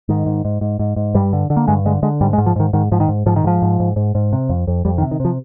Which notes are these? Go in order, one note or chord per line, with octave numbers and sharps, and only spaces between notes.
G#2 D#3
G#2
G#2
G#2
G#2
G#2
G2 G3
D3
D3
A#3
G2 G#3
D3 G#3
D3 G#3
G#2 G3
G#3
G#2
F3
G#2 D#3
G#2 D#3
G#2 F3
D#3
G#2
G#2 F3
D#3
G#2 F3
G#2
G#2
G#2
G#2
C3
F2
F2
F2 G3
D#3
C3
D#3
C3 F3